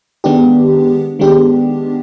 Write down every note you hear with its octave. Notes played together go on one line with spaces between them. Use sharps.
D#3 G#3 B3 D4 G4
D#3 G#3 B3 D4 G4